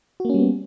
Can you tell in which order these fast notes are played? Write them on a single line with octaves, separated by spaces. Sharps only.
F#4 A#3 C#4 G3 B3